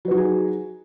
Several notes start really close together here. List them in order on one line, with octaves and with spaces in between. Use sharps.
F#3 B4 F#4 D#4 G#4